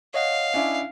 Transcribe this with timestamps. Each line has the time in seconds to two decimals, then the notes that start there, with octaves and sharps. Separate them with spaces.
0.14 C#5 D#5 F5 F#5
0.54 C#4 D4 E4